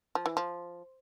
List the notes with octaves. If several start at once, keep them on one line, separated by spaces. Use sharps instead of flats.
F3
E3
F3